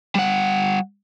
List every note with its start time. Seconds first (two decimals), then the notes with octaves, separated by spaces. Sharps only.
0.15 G3 F#5